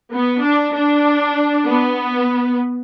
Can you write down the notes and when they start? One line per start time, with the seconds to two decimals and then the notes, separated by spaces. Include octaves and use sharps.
0.13 B3
0.43 D4
0.74 D4
1.65 B3